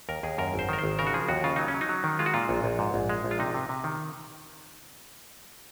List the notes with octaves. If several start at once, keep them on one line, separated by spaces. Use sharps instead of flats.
D#2 A#4
D#2 G#4
F#2 A#4
G#1
C5
D#3 A#4
C5
G#1
C#3 A#4
F#4
F3 G#4
D#2 F#4
C#3 F4
F#3 D#4
C#4
F#3
D#4
F#3
D#3
G#3 F4
F#4
A#2 F4
A#1
A#1
G#2
A#1
G#3
A#1
F4
C3 D#4
C3
C3
D#3